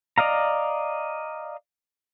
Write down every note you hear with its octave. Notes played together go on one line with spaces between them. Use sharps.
D5 D#5 F5 A#5